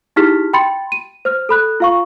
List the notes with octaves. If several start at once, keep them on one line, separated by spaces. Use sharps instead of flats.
D#4 E4 G4 G#4 F6 B6
G5 B5 C6 A6 C#7
D#7
C5 F6
A4 B5 F#6
F4 F5 C#6